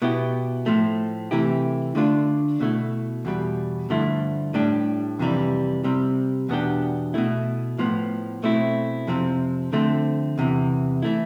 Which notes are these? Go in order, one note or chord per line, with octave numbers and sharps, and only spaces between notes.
B2 B3 E4 G4
A2 F3 A3
C3 E3 A3 E4 G4
D3 A3 D4 F4
B2 A3 E4
E2 B2 G3
G2 D3 F3 A3 E4
A2 G3 D4 G4
F2 C3 E3 G3
C3 G3 C4
E2 B2 B3 D4 G4
B2 A3 E4
A2 F3 B3
B2 A3 C4 E4
F2 C3 F3 C4
D3 F3 A3 C4
E2 C3 E3
E3 A3 E4